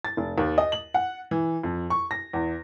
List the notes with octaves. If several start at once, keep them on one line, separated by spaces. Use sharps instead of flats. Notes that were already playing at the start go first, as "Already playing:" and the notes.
A6
F1
D#2
D#5
F#7
F#5
E3
F2
C#6
A#6
E2